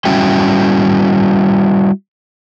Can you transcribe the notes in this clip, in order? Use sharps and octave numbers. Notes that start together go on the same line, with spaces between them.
G3 C#4 E4 F#4 G5